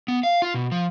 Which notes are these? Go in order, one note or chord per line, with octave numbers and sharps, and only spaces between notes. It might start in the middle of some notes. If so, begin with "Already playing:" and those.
B3
F5
F4
B2
F3